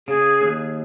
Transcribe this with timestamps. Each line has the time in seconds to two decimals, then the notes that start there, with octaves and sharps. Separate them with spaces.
0.08 C#3 G#4
0.42 D#2